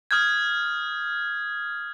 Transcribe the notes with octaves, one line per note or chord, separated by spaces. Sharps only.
D#6 F6 G6 G#6